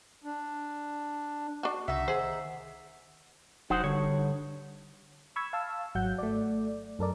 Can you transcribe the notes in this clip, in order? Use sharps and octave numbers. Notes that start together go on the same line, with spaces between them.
D4
D4 F#4
C2 C#3 D#4 E5 F#5
D#3 G#4 C5
F1 F#3 D#4 C5 F#5
G2 D3 C#5
B5 C#6 E6 G#6
F5 A5 E6
G#1 F#3 F#5 G6
A3 D5
F#2 A4 A#4 D5